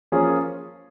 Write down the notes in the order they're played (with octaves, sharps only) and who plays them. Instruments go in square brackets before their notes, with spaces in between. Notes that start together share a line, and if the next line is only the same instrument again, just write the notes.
[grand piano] F3 A#3 C#4 F4 G#4